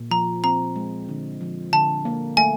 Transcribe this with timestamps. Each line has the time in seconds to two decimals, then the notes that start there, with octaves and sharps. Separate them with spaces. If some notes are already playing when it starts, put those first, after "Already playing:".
Already playing: A#2
0.11 F3 A#5
0.44 C4 A#5
0.76 G#3
1.09 D3
1.41 F3
1.73 D3 A5
2.05 A#3
2.37 A3 G#5